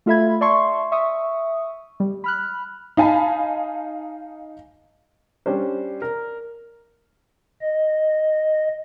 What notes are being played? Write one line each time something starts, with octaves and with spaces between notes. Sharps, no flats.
A3 F4 A4 E5 B5 G#6
D5 E5 A5 C6 C#6
E5 C#6 D#6
G3
B5 F6 F#6
D#4 F5 G#5 A5 B5
G3 C#4 D4 C5
A#4
D#5